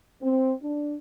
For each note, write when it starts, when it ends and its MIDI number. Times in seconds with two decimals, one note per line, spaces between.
0.23 0.52 60
0.62 0.96 62